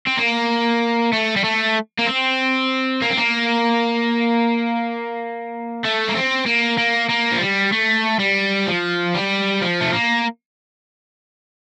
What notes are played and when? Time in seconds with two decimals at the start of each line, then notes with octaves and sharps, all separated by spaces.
0.07 C4
0.18 A#3
1.13 A3
1.37 G3
1.44 A3
1.99 A#3
2.06 C4
3.02 A#3
3.10 C4
3.17 A#3
5.85 A3
6.08 A#3
6.15 C4
6.46 A#3
6.78 A#3
7.10 A#3
7.32 F3
7.41 G3
7.73 A3
8.19 G3
8.67 F3
9.15 G3
9.62 F3
9.81 A3
9.93 A#3